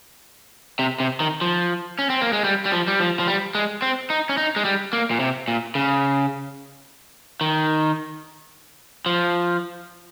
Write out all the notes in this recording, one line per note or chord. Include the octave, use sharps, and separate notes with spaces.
C3
C3
D#3
F3
C#4
C4
A#3
G#3
G3
G3
F3
G3
F3
F3
G3
G#3
C4
D#4
C#4
D#4
G#3
G3
A#3
A#2
C3
A#2
C#3
D#3
F3